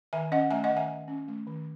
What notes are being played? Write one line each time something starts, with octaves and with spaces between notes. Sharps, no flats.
D#3 E5 G#5
C#4 D#5 F#5
A3 E5 G#5
D#5 F#5
D#3
E5 G#5
D#3
C#4
A3
D#3